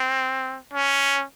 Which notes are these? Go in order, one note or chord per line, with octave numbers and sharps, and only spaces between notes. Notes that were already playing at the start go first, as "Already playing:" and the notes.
Already playing: C4
C#4